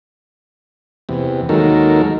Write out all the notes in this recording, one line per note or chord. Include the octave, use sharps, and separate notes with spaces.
E2 C3
D#2 D#3 F#3 G#3 A4 A#4